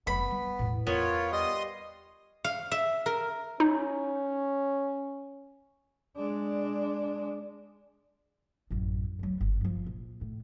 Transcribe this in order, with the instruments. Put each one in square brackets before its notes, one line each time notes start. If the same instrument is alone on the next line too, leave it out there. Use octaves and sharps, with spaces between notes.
[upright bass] F1 F#3 [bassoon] B3 [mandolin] B5
[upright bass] G3
E2 A2
[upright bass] E2 [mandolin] B3 [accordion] F4 C#5 [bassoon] A#4
[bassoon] G3 [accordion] D#5 C6 D#6
[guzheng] F5
E5
A#4
[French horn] C#4 [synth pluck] D#4
[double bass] G#3 D4
[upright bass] A1 F#2
D2 F#3
G1
F3 G3
A#1
A2